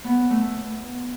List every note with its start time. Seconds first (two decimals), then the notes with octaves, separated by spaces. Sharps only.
0.04 B3
0.30 A3